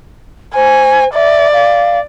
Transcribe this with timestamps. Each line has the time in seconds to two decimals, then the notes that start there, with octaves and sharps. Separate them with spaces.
0.55 C5 G#5
1.15 D5 E5
1.53 F5